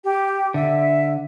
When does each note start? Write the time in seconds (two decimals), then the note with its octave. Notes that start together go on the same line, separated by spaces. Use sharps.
0.04 G4
0.54 D3 E5